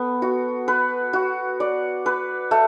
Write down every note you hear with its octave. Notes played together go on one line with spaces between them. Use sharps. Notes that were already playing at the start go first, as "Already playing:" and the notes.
Already playing: B3 A4
F#4
B4
F#4
D5
B4
A3